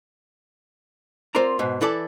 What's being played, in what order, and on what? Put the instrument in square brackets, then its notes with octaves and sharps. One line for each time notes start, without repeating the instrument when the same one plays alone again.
[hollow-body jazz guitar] C4 F4 A#4 D5 A#5
G#2 B2
E3 E4 A4 D5